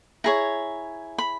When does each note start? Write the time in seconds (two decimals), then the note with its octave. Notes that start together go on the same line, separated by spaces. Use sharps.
0.24 E4 G#4 C#5 A#5
1.18 B5